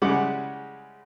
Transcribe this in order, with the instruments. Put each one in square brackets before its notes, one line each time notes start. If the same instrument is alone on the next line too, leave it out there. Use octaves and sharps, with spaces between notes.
[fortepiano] C#3 G3 G#3 E4 F#5 D6